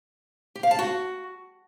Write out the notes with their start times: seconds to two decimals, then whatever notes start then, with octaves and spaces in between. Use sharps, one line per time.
0.56 G4
0.63 F5
0.71 A5
0.79 F#4